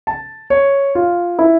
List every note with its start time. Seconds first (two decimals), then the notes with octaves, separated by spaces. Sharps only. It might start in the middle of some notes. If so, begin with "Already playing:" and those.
0.07 A5
0.50 C#5
0.95 F4
1.39 E4